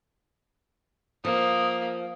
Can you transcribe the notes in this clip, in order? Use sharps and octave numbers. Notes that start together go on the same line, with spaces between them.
F3 A#3 D#6